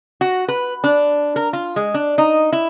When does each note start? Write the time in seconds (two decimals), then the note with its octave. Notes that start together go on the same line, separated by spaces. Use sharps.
0.21 F#4
0.48 B4
0.84 D4
1.36 A#4
1.53 F4
1.76 G#3
1.94 D4
2.18 D#4
2.52 E4